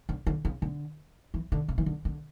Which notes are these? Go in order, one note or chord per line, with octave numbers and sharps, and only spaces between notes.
D3
D3
C#3
D3
E3
D3
C#3
E3
D3
D3